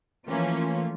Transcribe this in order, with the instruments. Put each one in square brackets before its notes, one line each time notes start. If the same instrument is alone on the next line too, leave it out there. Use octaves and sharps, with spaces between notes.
[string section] E3 F3 A3 A#3 C#4 F4